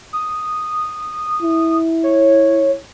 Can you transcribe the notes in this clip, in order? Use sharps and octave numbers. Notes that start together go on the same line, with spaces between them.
D#6
E4
C#5